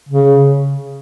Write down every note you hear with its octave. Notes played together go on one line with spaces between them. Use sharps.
C#3